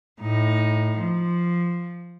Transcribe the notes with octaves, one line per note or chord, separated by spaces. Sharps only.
A2 D#4
F3